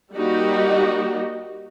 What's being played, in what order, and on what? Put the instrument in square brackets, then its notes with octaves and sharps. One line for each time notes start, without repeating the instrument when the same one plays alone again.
[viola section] G3 A#3 D#4 F#4 G4